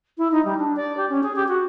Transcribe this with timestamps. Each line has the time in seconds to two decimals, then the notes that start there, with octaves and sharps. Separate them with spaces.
0.18 E4
0.32 D#4
0.45 G3
0.59 D4
0.76 D5
0.97 G4
1.09 C#4
1.23 G#4
1.36 G4
1.48 F#4